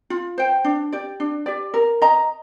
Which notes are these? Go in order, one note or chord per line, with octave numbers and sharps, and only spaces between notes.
F4
C5 G5
D4
G4 D5
D4
G4 D5
A#4
D#5 A#5